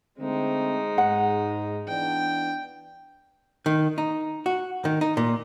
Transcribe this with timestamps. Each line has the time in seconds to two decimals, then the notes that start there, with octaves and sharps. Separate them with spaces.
0.19 D3 G#3 A3 C4 D#4
0.98 G#2 F#5
1.88 E3 B3 D4 G5
3.66 D#3
3.98 D#4
4.46 F#4
4.85 D#3
5.01 D#4
5.17 A#2